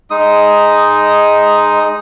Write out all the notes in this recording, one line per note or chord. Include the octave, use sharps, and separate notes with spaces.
G#3 D#4 D#6